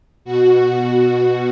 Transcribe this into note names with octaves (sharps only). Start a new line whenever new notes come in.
B2 F#4